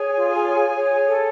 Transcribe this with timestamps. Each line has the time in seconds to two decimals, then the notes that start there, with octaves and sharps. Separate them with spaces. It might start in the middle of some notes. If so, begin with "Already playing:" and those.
Already playing: G#4 C#5 G#5
0.16 F4
0.46 C#5
0.77 C#5
1.08 A4